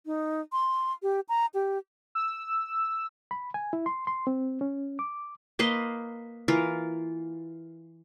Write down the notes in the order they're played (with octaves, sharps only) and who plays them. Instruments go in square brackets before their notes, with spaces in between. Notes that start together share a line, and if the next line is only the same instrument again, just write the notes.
[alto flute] D#4
C6
G4
A#5
G4
[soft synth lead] E6
[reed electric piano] B5
G#5
E4
C6
C6
C4
C#4
D6
[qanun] A#3 B4 D#5 C6
E3 F4 A#4